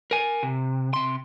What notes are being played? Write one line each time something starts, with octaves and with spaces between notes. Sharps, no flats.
A#4 G#5
C3
C3 C6